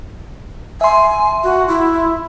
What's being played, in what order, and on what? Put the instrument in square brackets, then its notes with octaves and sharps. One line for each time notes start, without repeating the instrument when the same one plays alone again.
[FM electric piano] E5 C6 [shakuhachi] G#5
[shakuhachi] F#4
E4